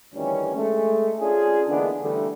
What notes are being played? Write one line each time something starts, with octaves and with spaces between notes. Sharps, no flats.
D2 D#3 E3 G3 C#4
G#3 A3
C#4 D4 F4 G#4
D3 E3 G#3 A#3 B3 D4
D3 E3 G3 A3